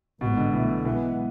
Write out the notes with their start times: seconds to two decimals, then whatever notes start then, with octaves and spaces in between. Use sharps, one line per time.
0.21 A1 G#2 B2 G#3 B3
0.37 D3
0.53 B1 B2 E3 A3
0.85 B1 B2 E3 G#3 B3